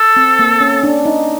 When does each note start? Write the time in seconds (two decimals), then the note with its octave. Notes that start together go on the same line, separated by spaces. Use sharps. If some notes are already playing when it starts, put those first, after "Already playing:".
Already playing: A4
0.16 C4
0.39 A#3
0.61 C#4
0.83 D4
1.06 D#4